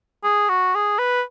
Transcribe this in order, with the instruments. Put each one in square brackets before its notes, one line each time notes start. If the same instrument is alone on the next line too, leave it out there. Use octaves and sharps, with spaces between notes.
[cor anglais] G#4
F#4
G#4
B4